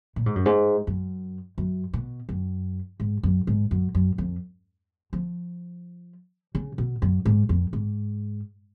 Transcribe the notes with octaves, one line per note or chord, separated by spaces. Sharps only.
A#2
G#2
F#2
G#2
F#2
F#2
B2
F#2
G#2
F#2
G#2
F#2
F#2
F2
F3
C#3
B2
F#2
G#2
F2
G#2